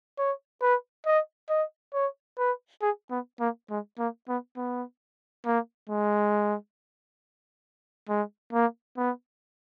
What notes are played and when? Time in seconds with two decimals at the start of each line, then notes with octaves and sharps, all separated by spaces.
0.18 C#5
0.61 B4
1.06 D#5
1.50 D#5
1.93 C#5
2.38 B4
2.82 G#4
3.10 B3
3.40 A#3
3.70 G#3
3.99 A#3
4.28 B3
4.57 B3
5.46 A#3
5.89 G#3
8.09 G#3
8.53 A#3
8.97 B3